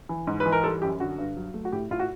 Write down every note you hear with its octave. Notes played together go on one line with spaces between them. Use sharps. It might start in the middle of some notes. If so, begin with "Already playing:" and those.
E3
G#2
B4
E3
A#4
G3 A4
F#2 G4
D3 F#4
G2
F#3
A3
F#4
A2 G4
A2 F4
F#4